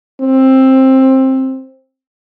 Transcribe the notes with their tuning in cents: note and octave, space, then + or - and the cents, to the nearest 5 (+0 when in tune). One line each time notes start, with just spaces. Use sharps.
C4 +15